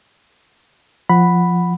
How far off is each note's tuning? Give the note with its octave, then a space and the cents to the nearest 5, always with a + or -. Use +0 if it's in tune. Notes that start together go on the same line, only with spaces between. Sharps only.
F3 +0 F#5 +0 B5 +0